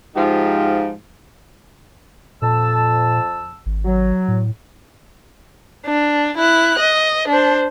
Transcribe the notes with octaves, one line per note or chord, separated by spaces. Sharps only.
G#2 F3 D#4 F4 G4
F2 A#2 A5 E6
G#1
F#3
A2
D4
E4 F#6
D#5
D4 C5